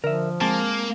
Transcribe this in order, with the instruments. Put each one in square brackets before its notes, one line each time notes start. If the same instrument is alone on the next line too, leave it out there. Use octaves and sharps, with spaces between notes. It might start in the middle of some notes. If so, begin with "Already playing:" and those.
[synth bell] D3 [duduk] F3 [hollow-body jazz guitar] A#4 E5
[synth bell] G#3 C4 [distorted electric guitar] A#3 [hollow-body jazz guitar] A5